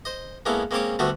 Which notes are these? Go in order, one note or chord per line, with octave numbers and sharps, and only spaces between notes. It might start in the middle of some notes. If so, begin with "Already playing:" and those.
C5 D#5
G#3 A#3 B3 C#4 E4 A4
G#3 A#3 C4 C#4 C#5 D6
D2 D3 G3 A3 B3 F#4